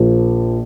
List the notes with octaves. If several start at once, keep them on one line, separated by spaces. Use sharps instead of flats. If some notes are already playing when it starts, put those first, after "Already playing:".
Already playing: A#1 A#2 F3 A#3